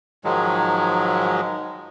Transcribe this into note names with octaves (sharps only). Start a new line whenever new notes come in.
G#2 D#3 F3 F#3 G#3